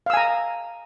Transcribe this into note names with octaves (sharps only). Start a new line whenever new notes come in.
F5 G#5 A#5 E6